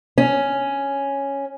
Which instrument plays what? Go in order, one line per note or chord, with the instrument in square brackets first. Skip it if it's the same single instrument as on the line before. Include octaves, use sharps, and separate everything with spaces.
[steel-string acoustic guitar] C#4